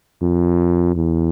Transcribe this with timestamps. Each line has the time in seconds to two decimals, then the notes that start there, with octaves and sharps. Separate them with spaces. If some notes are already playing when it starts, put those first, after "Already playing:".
0.22 F2
0.96 E2